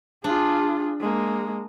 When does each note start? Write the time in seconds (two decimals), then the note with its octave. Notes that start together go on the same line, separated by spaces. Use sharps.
0.24 D4 F4 G#4
1.00 G#3 A#3